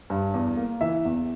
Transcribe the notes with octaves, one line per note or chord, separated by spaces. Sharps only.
G2
E2
A#3
E3 E5
E2